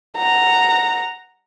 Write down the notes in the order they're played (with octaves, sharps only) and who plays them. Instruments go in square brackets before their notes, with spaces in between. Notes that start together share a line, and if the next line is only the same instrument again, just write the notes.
[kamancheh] F#5 A#5